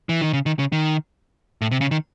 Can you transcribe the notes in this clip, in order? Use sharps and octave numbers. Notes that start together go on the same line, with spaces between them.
E3
D#3
C#3
D#3
C#3
D#3
A2
C3
C#3
D#3